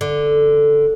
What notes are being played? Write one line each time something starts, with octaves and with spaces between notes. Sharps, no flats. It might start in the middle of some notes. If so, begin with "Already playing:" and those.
D3